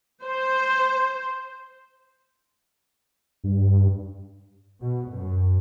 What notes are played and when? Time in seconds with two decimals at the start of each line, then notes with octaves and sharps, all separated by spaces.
0.24 C5
3.44 G2
4.81 B2
5.13 F#2